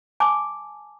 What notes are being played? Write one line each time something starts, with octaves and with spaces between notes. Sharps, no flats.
G#5 A5 D6